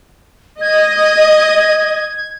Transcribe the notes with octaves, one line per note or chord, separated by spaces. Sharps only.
D#5 G#6